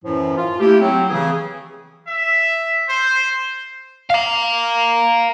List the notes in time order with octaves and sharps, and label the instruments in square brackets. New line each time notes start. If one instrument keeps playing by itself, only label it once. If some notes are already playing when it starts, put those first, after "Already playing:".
[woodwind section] F#2 A2 E3 F3
F4
A3 A#3 E4 G4
F#3 C4
C#3 E3 G#4
[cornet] E5
C5
[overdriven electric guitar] F5 A#5